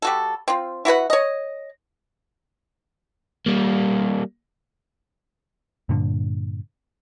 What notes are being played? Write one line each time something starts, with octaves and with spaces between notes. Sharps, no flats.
G3 F#4 A4
C4 F4
E4 F#4 B4 F#5
C#5 D#5
G3 A#3
G2 A#2 D3